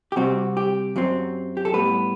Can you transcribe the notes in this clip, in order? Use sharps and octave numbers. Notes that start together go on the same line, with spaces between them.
G4
C3 G3 C4 F#4
G4
F#2 F#3 C4
G4
A4
A2 G3 B3 B4